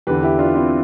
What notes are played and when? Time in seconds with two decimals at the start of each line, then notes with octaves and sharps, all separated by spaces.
0.07 E2 D3 G4 B4
0.23 E4 G4
0.39 D4 F4
0.55 C4 E4